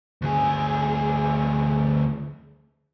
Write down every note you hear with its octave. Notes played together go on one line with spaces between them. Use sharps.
D2 G#4